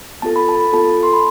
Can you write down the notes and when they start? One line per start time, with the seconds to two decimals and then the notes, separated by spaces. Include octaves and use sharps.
0.22 B3 F4 A4 A5
0.36 B5
0.49 A5
0.60 B5
0.73 B3 F4 A4 A5
1.03 C6
1.13 B5